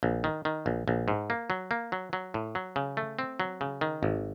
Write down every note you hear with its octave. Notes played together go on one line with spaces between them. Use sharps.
A#1
D#3
D#3
A#1
A#1
G#2
A#3
F#3
A#3
F#3
F#3
A2
F#3
C#3
A3
C4
F#3
C#3
D#3
G#1